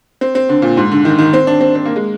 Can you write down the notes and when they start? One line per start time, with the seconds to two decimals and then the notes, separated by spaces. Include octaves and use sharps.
0.21 C4
0.35 C4
0.49 D3
0.62 A#2
0.77 G#2
0.91 D3
1.05 D#3
1.19 D#3
1.33 C4
1.47 D4
1.61 C4
1.75 C4
1.85 A#3
1.96 G#3